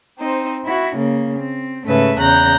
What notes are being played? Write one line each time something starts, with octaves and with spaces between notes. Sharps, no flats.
C4 D#4 C5
E4 F#4
C#3 A#3
C4
G#2 C#3 A3 B4 E5
E2 C#3 A#5 F#6 G6 A#6